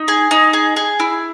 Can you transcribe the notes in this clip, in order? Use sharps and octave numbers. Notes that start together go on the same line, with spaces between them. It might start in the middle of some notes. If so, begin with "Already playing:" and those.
Already playing: D#4
G#4
D#4
G#4
G#4
E4